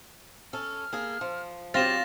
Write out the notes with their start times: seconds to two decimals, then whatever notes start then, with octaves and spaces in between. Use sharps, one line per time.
0.53 C#4 A4 F6
0.93 A#3 G#4 A4
1.21 F3
1.74 F#3 C4 F4 G4 A6 A#6 E7